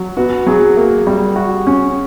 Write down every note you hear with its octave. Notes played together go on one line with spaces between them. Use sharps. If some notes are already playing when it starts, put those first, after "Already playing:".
Already playing: F#3
B3 F#4
F#3 G#4
A#3
G3
F#4
C#4